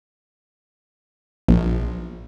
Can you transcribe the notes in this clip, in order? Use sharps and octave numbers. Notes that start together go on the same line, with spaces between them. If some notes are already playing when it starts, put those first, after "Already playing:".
A#1